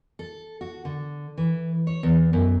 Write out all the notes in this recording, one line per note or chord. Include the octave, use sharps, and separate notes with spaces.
A4
F#4
D3
E3
C#5
E2
F#2